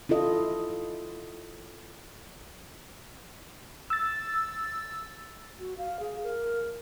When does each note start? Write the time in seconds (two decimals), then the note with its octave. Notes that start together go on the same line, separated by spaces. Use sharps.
0.09 E4 F4 A4 D#5
3.90 E6 A6
5.59 F#4
5.78 F5
6.00 G#4
6.23 A#4